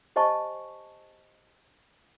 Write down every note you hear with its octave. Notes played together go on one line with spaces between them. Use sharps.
G4 C5 D#5 G#5 A5 C#6